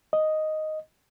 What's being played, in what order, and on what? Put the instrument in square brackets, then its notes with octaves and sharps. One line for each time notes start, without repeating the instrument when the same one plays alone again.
[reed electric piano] D#5